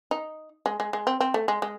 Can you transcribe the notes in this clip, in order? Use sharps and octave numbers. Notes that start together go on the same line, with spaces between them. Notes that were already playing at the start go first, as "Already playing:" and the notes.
D#4
G#3
G#3
G#3
C4
C4
A3
G#3
G#3